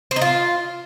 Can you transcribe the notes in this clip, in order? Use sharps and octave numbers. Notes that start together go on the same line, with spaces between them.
C4
D#4
F4